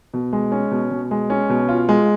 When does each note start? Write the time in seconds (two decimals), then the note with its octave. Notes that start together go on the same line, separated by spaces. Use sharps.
0.14 B2
0.33 G#3
0.52 C#4
0.71 B2
0.91 B2
1.11 G#3
1.30 C#4
1.49 B2
1.69 F4
1.89 G#3